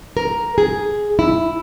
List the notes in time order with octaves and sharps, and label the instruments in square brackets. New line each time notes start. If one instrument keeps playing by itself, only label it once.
[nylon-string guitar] A#4
G#4
E4